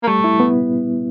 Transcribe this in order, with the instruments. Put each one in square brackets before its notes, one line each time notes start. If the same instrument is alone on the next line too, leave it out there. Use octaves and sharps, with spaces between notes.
[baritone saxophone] A#3
[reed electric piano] G3 [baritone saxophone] A3
[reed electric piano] E4
B3